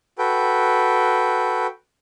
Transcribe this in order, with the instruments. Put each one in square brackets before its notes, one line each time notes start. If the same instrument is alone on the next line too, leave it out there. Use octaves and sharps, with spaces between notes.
[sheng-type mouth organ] F#4 A4 B4 G5